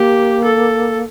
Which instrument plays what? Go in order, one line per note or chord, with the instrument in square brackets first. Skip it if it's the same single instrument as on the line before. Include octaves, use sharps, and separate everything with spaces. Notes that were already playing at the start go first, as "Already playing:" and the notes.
Already playing: [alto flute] A#3 [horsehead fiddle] G4
[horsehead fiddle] A4